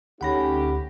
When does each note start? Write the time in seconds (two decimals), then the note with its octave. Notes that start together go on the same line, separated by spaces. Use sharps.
0.21 D2 A3 C#4 D#4 G4 F#5 B5 A#6